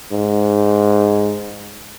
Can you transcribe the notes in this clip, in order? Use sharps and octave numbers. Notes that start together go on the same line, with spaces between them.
G#2